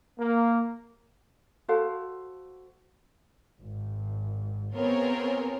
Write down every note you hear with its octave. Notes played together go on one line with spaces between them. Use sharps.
A#3
F#4 A4 C5 F5
G#1
B3 C4 F4 G#4 A#4 C#5